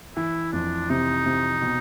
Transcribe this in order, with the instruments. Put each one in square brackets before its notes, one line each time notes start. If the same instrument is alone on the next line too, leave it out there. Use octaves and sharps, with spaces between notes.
[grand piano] E3 [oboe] E4
[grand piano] F2 [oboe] D4
[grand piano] C3 [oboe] D#4
[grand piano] C3
B2